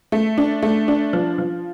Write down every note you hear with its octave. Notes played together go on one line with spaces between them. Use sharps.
A3
D4
A3
D4
F3
F3